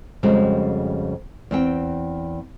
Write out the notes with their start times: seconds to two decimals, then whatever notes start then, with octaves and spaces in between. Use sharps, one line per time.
0.23 F2 C#3 G3 G#3 F#4
1.51 E2 C4 G5